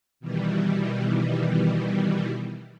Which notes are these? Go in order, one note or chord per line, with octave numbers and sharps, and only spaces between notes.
B2 D#3 E3 G3